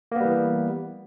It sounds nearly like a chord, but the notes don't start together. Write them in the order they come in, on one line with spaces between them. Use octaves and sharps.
A#3 B3 G3 E3